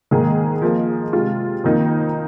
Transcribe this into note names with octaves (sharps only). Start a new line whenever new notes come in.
G#2 D#3 A#3 G#4
F3 A#3 G#4 D#5
C3 G#3 F4
F2 D#3 A#3 D#4